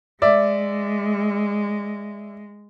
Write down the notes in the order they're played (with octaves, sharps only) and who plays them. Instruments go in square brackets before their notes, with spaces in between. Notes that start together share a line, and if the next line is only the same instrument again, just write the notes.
[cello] G#3 [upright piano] D5 E5